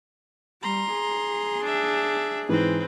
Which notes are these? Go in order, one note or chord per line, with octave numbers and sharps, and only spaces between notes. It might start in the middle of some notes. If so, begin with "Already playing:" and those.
G3 A#5 C6
G#4
D4 E5
G#2 E3 C4 B4